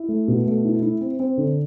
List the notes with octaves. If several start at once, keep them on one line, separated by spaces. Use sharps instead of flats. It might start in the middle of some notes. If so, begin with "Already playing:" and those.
Already playing: E4
A3
B2
A3
E4
E4
C4
C4
D3